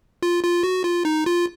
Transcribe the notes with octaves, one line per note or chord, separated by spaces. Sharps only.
F4
F4
F#4
F4
D#4
F4